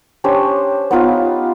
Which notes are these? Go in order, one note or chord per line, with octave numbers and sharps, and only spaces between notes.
C#4 D4 G4 C5
B3 D#4 F4 B4